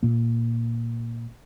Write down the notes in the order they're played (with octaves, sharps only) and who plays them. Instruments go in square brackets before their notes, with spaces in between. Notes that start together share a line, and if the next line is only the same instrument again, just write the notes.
[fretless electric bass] A#2 A#3